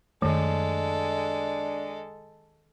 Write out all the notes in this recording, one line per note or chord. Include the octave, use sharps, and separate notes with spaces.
F#2 D#3 G#3 A3 D4 A4